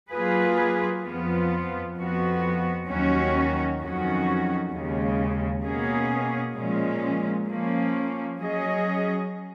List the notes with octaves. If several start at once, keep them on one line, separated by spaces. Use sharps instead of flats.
F#3 A#3 F4 G#4 B4
F2 F3 B3 F4
F2 F3 B3 F#4
D#2 D#3 F#3 C#4 F#4
F2 D#3 F#3 C#4 F#4
D#2 C#3 G#3
B2 A#3 C#4 G#4
A#2 F3 G#3 C#4
F3 A#3 C#4
F#3 C#4 G#4 D#5